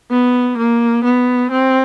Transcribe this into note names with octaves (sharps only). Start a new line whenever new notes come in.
B3
A#3
B3
C4